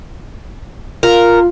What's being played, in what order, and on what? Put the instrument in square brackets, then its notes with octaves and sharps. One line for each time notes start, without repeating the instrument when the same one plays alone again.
[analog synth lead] F4 [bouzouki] A#4